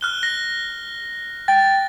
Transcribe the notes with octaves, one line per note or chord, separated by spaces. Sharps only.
F6 F#6 G7
A#6
G5 A6